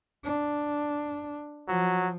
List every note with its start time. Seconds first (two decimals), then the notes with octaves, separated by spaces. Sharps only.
0.24 D4
1.68 F3 F#3